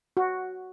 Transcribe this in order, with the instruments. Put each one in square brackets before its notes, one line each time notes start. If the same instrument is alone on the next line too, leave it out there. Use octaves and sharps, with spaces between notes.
[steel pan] F#4